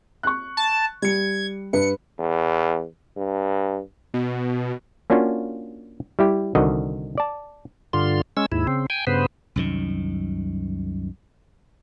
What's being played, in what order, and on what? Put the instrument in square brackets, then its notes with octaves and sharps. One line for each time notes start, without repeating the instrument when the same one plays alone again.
[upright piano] C#6 F#6
[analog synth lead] A5
[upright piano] G3 C#7 [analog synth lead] G#6
[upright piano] G2 B4 [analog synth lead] C#7
[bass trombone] E2
G2
[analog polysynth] B2
[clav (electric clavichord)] A#3 C#4 D4 F4 F#4
G3 E4 G4
C2 D3 D#3 F#4 D#5
D5 A5
[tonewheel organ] G2 D3 F4 C6
G#3 C#4 E6
D#2 G#2 E4
C#3 C4
G5 G#5
G2 C#3 B3 B4 C5
[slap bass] C2 F#2 D#3